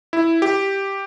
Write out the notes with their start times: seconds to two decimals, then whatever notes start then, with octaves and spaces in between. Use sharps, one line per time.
0.13 E4
0.42 G4